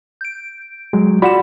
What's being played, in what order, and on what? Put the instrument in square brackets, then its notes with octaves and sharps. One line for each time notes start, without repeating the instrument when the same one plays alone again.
[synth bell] G6 D7
[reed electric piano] F#3 G#3
[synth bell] F4 F#5 E7 [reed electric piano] F#4 D5 B5